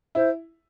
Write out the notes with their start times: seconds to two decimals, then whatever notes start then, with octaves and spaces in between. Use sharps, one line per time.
0.15 E4 C5